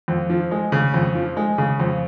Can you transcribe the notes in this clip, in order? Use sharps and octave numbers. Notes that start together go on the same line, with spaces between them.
F2
F3
G#3
C#3
F2
F3
G#3
C#3
F2